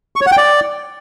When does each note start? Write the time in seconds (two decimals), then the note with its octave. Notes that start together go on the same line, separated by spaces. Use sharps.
0.16 C#6
0.21 C#5
0.27 F#5
0.32 G5
0.37 D5